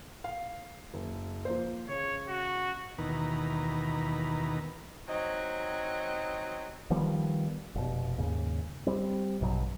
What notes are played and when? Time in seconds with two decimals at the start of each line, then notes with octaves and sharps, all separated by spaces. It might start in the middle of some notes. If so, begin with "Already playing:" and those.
0.24 F5
0.94 F#1
1.45 F3 A#3 C5
1.89 C#3 C#5
2.29 F#4
2.98 D#2 B2 D#3 E3 B4 A#5
5.08 F#3 C4 D#4 D#5
6.90 D#3 F3 G3 B3
7.75 F1 B2
8.18 D#2 G#2 C#3
8.87 G3 C4
9.41 A#1 G2 B2 F#3